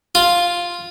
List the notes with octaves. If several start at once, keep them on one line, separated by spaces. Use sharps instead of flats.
F4